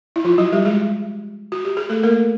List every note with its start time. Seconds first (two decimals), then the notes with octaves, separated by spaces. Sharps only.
0.16 E4
0.24 F3 F4
0.38 F#3 F#4
0.52 G3 G4
0.65 G#3 G#4
1.52 F#4
1.65 G4
1.77 G#4
1.90 A3 A4
2.03 A#3 A#4